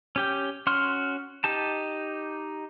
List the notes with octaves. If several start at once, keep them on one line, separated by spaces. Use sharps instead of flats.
C#4 G4 G5
C#4 F#4 C6 F6
D#4 G4 A5